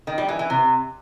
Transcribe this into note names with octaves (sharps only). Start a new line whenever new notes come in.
D#3
G3
E3
E3
C3